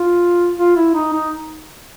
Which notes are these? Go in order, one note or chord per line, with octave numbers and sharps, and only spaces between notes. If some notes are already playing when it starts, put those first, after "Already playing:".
Already playing: F4
F4
E4
D#4
D#4